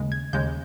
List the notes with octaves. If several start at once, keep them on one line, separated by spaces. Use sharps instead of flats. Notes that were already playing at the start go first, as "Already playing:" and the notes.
Already playing: D#2 C#3 G#3
G#6
D#2 C#3 G#3 G6